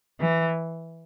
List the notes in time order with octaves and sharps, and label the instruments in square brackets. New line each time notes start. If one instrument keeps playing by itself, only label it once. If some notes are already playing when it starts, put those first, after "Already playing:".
[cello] E3